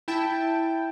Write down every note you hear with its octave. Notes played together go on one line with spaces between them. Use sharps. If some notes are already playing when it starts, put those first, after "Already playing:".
E4 G5 A5